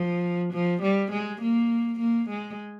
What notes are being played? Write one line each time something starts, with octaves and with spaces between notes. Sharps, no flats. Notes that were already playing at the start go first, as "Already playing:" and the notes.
Already playing: F3
F3
G3
G#3
A#3
A#3
G#3